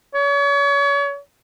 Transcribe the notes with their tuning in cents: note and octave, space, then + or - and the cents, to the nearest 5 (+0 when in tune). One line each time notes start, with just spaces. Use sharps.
C#5 +35